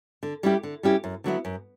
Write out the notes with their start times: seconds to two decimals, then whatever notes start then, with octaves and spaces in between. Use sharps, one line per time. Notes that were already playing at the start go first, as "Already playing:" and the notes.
0.23 D3
0.43 G3 C#4 E4 G4
0.63 D3
0.83 G3 C#4 E4 G4
1.04 F#2
1.24 D3 F#3 B3 E4
1.45 F#2